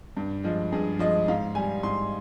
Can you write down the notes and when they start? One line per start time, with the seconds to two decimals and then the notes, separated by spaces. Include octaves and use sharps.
0.17 G2
0.44 F3 G#3
0.72 G2 G#4
0.99 F3 G#3 D#5
1.28 G#2 F5
1.55 G3 G#5
1.83 G#2 C6